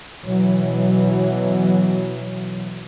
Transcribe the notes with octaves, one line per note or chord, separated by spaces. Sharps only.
B2 E3 F#3